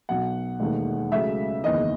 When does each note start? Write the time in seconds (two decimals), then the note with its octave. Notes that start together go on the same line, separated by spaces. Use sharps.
0.09 B1 B2 F#3 F#5
0.60 E1 D#2 D#3 A3
1.12 C#2 C#3 F#3 A3 E5
1.64 F#1 E2 D#3 D#5